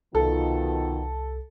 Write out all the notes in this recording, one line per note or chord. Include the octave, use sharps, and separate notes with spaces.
C2 B2 D#3 F4 A4